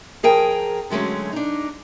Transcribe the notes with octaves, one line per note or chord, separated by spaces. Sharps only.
F3 G#4 A#4 G5
D3 F#3 G#3 A3 C#4
D4 D#4